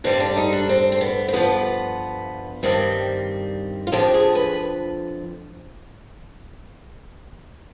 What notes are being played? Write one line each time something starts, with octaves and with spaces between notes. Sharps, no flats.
G2 D3 G3 C4
D4
D#4
D4
C4
C4
B3
C4
G2 F3 B3
G2 D#3 G3 C4
F4
F2 D3 F3 G4
G#4
B4